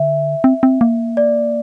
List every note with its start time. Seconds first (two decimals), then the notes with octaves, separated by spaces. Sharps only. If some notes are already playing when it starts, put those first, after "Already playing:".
Already playing: D3 E5
0.44 C4
0.63 C4
0.81 A#3
1.17 D5